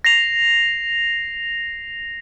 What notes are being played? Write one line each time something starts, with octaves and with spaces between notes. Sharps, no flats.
A#6 C7 F7